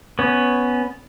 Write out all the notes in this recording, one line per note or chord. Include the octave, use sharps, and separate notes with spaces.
B3 C#4